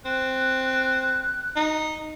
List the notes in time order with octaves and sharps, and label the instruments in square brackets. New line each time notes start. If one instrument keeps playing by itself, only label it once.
[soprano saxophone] C4 [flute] F#6
[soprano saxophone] D#4